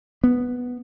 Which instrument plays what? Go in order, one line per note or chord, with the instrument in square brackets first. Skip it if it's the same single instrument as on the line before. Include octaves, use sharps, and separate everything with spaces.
[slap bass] B3